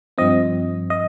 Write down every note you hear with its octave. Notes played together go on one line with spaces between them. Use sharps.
G2 F3 C4 D#5
D#5